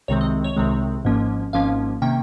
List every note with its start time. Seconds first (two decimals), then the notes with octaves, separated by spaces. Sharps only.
0.08 C2 C3 D#3 G#3 C4 C#5
0.21 D#5
0.44 C#5
0.57 C2 C3 D#3 G#3 C4
1.05 G#1 G#2 F3 A#3 C#4
1.53 G#1 G#2 F3 A#3 C#4 F5
2.02 C3 D#3 A#3 C#4 G5